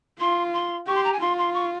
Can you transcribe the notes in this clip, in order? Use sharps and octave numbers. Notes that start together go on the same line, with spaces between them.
F4 C6
C6
G4 C#6
C6
A#5
G#5
F4 C6
C6
C#6